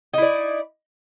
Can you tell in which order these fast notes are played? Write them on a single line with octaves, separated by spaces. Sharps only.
D#4 E4 D5